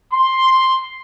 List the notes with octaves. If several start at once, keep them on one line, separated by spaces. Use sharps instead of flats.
C6